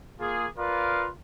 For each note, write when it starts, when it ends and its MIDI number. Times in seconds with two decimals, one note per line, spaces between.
0.20 0.47 58
0.20 0.47 65
0.20 0.47 68
0.57 1.08 65
0.57 1.08 70
0.57 1.08 71
0.57 1.08 74
0.57 1.08 77